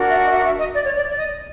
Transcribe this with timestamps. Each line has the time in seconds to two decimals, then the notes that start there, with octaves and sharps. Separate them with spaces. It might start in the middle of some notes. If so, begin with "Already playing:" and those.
Already playing: D4 F#4 A#4
0.09 E5
0.24 D#5
0.30 E5
0.44 E5
0.59 D#5
0.74 D5
0.85 C#5
0.95 D5
1.09 D5
1.18 D#5